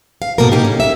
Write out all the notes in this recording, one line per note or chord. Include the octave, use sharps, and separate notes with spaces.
F5
G#2 B2 A#3 A4 A#4
A#3 D#4 G4
C#4
E5